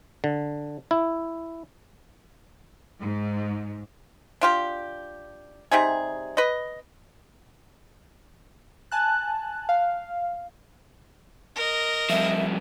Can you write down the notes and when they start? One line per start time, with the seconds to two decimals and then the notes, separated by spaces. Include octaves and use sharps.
0.24 D3
0.91 E4
3.01 G#2
4.41 D4 F4 G4
5.71 C3 G3 D#4 G#4
6.37 B4 D#5
8.92 G#5 A5 F#6
9.69 F5
11.56 A#4 D#5
12.10 G2 F3 E5